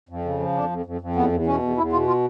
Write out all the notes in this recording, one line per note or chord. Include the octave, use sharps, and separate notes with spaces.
F2
C#3
F3
F2 D4
F2
F2
F2
E2 B3
E2
B2 C#4
E2
E2 E4
B2 F4
F4